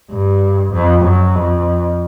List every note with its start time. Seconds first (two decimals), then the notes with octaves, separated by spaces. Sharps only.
0.11 G2
0.72 F2
1.04 F#2
1.35 F2